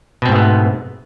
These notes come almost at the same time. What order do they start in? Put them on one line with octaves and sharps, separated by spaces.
B2 C4 G#2 A3 B3